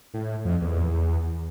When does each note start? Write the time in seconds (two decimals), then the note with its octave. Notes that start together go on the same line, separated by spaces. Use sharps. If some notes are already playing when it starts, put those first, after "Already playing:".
0.14 A2
0.45 F2
0.62 E2